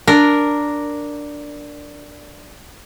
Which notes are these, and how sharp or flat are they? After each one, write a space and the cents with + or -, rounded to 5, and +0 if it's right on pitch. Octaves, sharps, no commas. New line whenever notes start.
D4 +0 A#4 +0